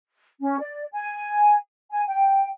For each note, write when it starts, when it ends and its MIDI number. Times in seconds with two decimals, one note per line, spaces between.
0.40 0.57 61
0.59 0.84 74
0.92 1.54 80
1.91 2.01 80
2.07 2.47 79